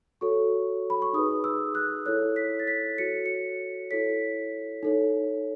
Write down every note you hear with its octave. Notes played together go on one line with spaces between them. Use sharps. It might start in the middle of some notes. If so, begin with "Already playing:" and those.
F#4 A4 C#5 C#6
B5
C#6
D#4 G#4 B4 D#6
E6
F#6
E4 A4 C#5 F#6
B6
A6
B6
F#4 A4 C#5 C#7
C#7
E4 A4 C#5 B6
D#4 A4 C#5